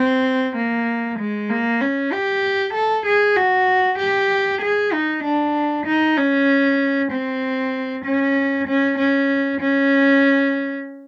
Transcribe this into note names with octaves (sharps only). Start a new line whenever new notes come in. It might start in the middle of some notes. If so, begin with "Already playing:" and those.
Already playing: C4
A#3
G#3
A#3
C#4
G4
A4
G#4
F#4
G4
G#4
D#4
D4
D#4
C#4
C4
C#4
C#4
C#4
C#4